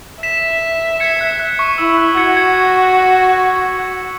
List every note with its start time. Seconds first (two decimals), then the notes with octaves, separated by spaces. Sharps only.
0.23 E5 B6 E7
1.00 G#6 C#7
1.21 F#6
1.39 F#6
1.59 C#6
1.78 E4 E6
1.97 F#6
2.17 F#4 G#6 C#7
2.37 G#6 C#7